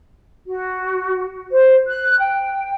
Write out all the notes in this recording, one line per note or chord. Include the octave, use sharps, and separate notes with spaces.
F#4
C5
F#6
G5